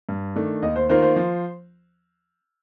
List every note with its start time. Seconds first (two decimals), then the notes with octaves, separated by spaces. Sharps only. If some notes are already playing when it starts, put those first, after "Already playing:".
0.09 G2
0.36 D#3 A3 D4
0.62 D#2 D#5
0.76 C5
0.89 D#3 A#3 F4 A#4 C5
1.02 C5
1.16 F3